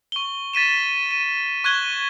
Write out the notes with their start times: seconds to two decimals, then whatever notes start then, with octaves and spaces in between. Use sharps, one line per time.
0.12 C#6 G7
0.53 A6 B6 D#7 E7
1.11 D#7
1.64 C#6 F#6 G#6 G7